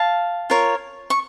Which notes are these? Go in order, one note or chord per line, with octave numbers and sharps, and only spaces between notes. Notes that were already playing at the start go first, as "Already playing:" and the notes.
Already playing: F5 A5
F4 A#4 C#5
C#6